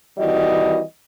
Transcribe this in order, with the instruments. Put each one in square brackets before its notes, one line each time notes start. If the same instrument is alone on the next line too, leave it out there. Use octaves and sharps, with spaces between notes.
[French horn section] D#3 E3 G3 C4 F#4 D#5